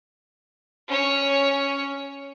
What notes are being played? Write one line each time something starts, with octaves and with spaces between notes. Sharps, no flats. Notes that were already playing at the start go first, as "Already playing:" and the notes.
C#4 C#5